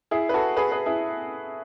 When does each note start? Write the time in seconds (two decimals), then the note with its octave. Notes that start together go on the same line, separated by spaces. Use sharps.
0.11 E4 G#4
0.29 B4
0.34 F#4 A4
0.57 G#4 B4
0.72 G#4 B4
0.86 E4 G#4